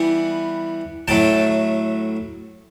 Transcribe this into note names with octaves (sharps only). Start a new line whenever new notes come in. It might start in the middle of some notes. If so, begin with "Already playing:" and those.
Already playing: E3 G3 B3 F#5 G#5
A2 F#3 A3 G5 A5